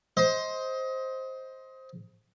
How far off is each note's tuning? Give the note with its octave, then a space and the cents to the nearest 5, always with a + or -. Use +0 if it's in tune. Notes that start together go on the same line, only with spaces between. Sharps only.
C5 +5 D#5 +25